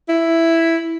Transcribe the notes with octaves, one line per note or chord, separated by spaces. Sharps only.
E4